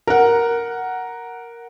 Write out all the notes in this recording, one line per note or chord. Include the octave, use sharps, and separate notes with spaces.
A#4 F#5